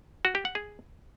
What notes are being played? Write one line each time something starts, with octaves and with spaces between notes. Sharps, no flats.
F#4
G4
F#5
G#4